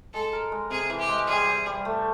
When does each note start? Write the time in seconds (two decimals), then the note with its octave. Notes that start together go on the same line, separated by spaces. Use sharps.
0.13 G#3 A4
0.33 A#4
0.52 G#3
0.70 C3 G#4
0.90 E3
0.99 G4
1.08 G#3
1.28 G3 G#4
1.47 G3
1.66 G3
1.85 A3